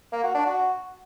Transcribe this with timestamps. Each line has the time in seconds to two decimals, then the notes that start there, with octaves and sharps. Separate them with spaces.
0.13 A#3
0.24 F#4
0.35 D4
0.46 F#4